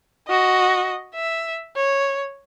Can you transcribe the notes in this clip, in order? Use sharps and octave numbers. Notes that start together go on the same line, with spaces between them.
F#4 D#5
E5
C#5